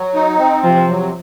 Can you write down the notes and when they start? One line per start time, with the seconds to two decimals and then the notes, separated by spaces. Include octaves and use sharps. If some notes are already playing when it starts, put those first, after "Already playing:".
Already playing: F#3
0.14 D#4
0.38 C4
0.63 C3 F3
0.88 F#3